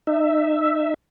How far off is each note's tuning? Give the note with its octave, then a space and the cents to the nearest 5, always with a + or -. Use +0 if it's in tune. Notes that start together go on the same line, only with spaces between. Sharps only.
D#4 -30 E5 +0